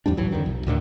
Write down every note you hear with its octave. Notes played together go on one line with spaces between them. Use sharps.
E2 G#2 G3 D4
D1 A#1 E3 F#3
F2 D3 D#3
B1
D2 A2 D3 D#3